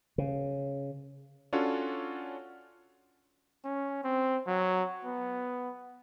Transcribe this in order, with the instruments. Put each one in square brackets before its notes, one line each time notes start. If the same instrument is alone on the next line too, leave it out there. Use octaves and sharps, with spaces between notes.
[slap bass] C#3
[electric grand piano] C#4 D4 F4 F#4 A4 C#5
[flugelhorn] C#4
C4
F#3
B3